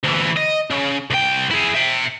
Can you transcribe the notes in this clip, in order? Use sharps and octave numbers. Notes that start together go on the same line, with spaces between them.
D2 E3
D#5
C#3
C2 G5
E4 G#4
E5 G5